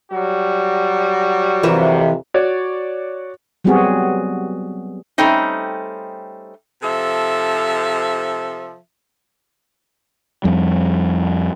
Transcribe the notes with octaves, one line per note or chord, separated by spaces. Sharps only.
F#3 G3 F#4
F2 C3 E3 A#4 E5
F#4 C#5 D5
F#3 G3 B3 C4 F#4 G#4
G3 A3 C4 C#4 D#4
C3 F3 A4 E5
F2 G3